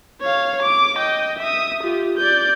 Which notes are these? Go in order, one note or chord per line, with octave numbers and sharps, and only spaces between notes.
C#5 F5
D6
D#5 G5
E5 D#6
F4 G4
D5 G6